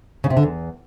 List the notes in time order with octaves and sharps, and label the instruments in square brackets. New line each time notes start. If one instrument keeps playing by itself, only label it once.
[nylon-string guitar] C#3
C3
D3
E2